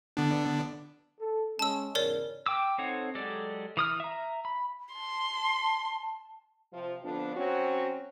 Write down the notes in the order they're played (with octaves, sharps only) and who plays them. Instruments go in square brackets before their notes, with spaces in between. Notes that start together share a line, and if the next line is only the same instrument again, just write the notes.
[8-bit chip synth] D3 B3 D4
[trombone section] A4
[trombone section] G#3 C#4 [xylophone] A5 E6
[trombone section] E2 G#2 C#3 [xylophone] A#4 C#5 D5
[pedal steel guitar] G5 D6 E6
C4 D#4 A4 C#5 F#5
F#3 G#3 G4 A4 D5
E3 D#6 F6
E5 A#5
B5
[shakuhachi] A5 [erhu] C6
[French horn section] C3 F3
F2 D3 F3 B3 D4
F#3 C4 C#4 F#4